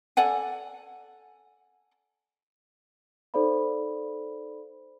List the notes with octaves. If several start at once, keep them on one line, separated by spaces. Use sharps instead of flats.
A4 D5 F#5 G#5
D#4 A4 C5 D5 F5 B5